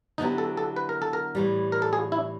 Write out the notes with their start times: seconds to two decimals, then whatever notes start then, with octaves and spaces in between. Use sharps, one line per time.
0.18 D3 F#3 B3 D#4 E4 G4
0.38 A4
0.57 A4
0.76 B4
0.89 A#4
1.02 A4
1.13 A#4
1.35 A2 E3 G3
1.72 A#4
1.82 A4
1.93 G#4
2.12 E4